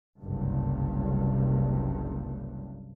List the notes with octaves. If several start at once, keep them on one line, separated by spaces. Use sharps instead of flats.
F#1 C2 G2